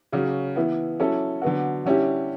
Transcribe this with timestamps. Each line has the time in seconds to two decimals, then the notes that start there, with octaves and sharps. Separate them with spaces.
0.12 C#3 F#3 C#4
0.56 E3 B3 E4
1.00 F#3 C#4 E4 A4
1.42 D3 F#3 B3 F#4
1.86 D3 G3 C#4 E4 G4